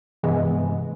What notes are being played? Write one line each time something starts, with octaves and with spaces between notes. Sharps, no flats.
G2 C3 E3 G#3 B3